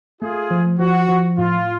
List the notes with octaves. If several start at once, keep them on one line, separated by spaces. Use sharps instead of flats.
A3 F4 G#4
F3
F3 F#4
F3
A2 F4